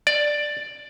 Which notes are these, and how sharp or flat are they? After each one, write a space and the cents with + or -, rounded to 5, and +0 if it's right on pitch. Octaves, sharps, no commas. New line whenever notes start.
D5 +5